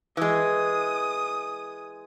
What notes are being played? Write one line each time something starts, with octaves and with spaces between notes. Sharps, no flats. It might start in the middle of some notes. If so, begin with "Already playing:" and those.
E3 G#3 D#6